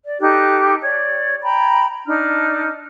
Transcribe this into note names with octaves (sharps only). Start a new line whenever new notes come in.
D5
D#4 G4 A4 F#6
C#5 D5
G5 A#5 B5
D4 D#4 F6